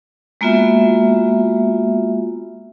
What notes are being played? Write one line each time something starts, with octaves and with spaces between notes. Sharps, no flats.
G#3 A#3 B3 F4 F#4 E5